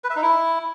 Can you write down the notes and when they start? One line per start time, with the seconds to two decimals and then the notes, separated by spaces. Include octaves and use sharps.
0.04 B4
0.10 E5
0.16 D#4
0.22 E4